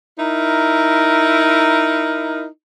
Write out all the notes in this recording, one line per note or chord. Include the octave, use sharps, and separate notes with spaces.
D#4 E4 A#4